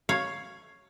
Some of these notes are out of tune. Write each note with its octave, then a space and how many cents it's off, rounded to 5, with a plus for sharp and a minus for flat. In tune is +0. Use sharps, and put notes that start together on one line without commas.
C#5 +0 F5 +5